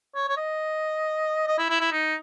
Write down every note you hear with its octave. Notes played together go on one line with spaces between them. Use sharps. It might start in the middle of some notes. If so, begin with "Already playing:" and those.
C#5
C#5
D#5
D#5
E4
E4
E4
D#4